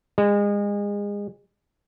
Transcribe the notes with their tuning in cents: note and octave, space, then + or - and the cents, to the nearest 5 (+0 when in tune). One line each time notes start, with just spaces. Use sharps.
G#3 -30